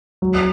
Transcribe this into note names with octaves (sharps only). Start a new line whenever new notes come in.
F#3